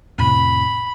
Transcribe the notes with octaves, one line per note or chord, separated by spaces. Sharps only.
F2 A2 C3 B5